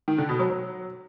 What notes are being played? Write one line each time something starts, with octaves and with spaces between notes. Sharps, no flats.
D#3
D3
B2
F#3
F#3